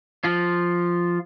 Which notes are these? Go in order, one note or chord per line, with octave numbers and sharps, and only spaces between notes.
F3 F4